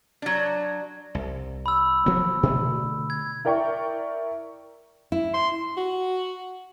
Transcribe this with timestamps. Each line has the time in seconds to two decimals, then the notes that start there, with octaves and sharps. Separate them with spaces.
0.22 F#3 D4
1.15 C2
1.66 B5 E6
2.06 F3 F#3 B3
2.43 B2 D3 A3
3.10 G#6
3.45 E4 A#4 D5 G5 C#6
5.12 E4
5.34 C6
5.77 F#4